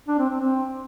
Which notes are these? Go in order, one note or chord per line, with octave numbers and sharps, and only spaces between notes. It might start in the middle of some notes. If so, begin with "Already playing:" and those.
D4
C4
C4
C4